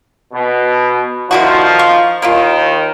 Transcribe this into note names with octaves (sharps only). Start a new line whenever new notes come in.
B2
D3 D#3 F3 E4 F#4
F5 C#6
D#2 D#3 A#3 E4 F4